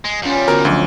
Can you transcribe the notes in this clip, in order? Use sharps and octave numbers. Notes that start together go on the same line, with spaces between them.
G#3
E2 G3 C#4 F4
D3 B3 F#4 A#4
D2 F3 F#3 D4